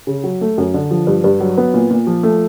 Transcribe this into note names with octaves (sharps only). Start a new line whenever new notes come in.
C#3
F#3
A3
F#2
D3
F3
G2
G2
F#3
B3
A#2
A#2
F3
A3